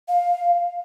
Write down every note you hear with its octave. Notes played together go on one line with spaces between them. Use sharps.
F5